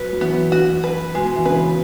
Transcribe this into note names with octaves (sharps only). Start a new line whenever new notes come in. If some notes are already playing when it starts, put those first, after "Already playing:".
Already playing: F#3 B4
F#3
E3 B3
F#4
B4
B2 G#3
E3
C#3 B4